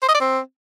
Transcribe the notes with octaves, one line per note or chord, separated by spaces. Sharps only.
C5
D#5
D5
C4